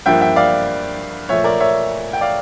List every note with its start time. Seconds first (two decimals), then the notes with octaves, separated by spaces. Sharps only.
0.06 G2 F3 A#3 E5 G5
0.21 E5 G5
0.36 D5 F5
1.29 A#2 F3 A3 C#5 E5
1.44 A#4 D5
1.60 C#5 E5
2.13 G5
2.21 D5 F5